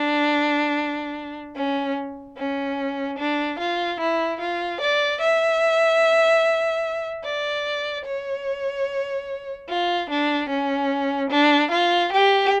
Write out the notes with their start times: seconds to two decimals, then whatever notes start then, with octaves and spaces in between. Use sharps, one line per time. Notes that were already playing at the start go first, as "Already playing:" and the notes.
Already playing: D4
1.55 C#4
2.37 C#4
3.18 D4
3.59 F4
4.00 E4
4.40 F4
4.81 D5
5.21 E5
7.24 D5
8.06 C#5
9.69 F4
10.10 D4
10.49 C#4
11.30 D4
11.71 F4
12.13 G4